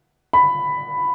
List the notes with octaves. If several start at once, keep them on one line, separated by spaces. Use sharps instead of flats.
B5